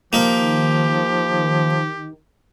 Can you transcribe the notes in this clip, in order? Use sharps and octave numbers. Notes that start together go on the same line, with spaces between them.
D#3 F3 A#3 D#4 G4